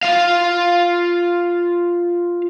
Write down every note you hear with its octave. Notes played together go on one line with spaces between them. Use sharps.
F4 F5